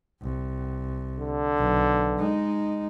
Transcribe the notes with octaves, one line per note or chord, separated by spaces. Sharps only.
C2
D3
B1
G#3 D#4